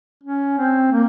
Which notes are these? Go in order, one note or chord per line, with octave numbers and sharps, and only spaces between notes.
C#4
C4
A#3